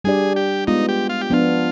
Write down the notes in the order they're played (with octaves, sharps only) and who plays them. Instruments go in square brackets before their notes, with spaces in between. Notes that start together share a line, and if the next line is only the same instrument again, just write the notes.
[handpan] G3 D4 G4 D5 [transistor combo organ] G#4
[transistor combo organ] G4
[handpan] G#3 B3 F4 [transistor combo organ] D#4
[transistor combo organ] G4
F4
G4
[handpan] F3 B3 D4 [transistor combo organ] F4